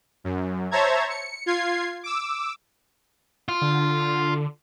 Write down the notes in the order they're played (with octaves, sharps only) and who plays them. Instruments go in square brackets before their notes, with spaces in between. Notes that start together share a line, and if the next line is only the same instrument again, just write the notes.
[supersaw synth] F#2
C5 C#5 E5 A5 A#5 G#6
C#7
F4 G#6 C7
D6 E6
[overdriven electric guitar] F4
[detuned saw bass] D3